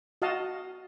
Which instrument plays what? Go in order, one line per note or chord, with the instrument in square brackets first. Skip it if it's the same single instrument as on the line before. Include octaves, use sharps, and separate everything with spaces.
[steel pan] F#4 D#5 F5 A5